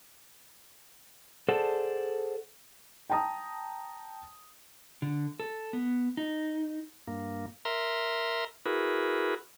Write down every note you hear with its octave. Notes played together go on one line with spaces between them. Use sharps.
G#4 A4 C5 D5 F#5 A5
G5 A5 A#5 D#6
D3
A4
B3
D#4
G2 A#3
A#4 E5 A#5 C6
E4 F#4 G#4 A#4 B4